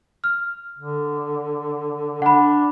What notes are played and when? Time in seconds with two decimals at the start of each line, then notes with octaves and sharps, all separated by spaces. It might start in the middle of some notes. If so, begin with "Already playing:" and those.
0.24 F6
0.78 D3
2.22 D4 F#5 B5